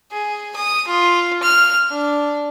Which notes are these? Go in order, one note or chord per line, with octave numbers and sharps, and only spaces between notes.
G#4
D#6
F4
F6
D4